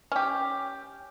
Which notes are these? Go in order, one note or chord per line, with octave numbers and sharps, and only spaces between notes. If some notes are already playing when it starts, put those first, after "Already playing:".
C#4 G4